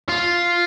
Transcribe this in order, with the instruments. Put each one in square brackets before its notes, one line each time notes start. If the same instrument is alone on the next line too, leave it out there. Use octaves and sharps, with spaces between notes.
[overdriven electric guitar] F4